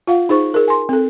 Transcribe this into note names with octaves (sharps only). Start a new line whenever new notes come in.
F4 F5 F#5
D#4 G#4 C5 C#6
G#4 A#4
G#5 C6
C4 A4